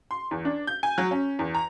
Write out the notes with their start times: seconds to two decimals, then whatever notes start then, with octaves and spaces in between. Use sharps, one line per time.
0.11 C6
0.31 E2
0.45 D4
0.67 G6
0.83 G#5
0.98 F#3
1.11 C#4
1.39 E2
1.55 A#5